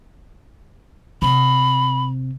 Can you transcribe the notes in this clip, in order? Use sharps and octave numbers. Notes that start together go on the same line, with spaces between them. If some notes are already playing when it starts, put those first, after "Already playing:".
C3 B5